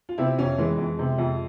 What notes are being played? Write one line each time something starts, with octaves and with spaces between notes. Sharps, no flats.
F4
C3 C4 E4
F2 C#4 F4
E3 G#3
F2
C3
F2